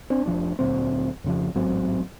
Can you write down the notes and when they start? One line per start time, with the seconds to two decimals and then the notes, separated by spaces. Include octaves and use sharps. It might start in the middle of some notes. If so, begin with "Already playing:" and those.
0.10 C4 D4
0.26 F1 E2 F3 D4
0.59 D2 A#2 F#3 C4
1.24 F2 C#3 F3
1.55 A1 G#2 F#3 C4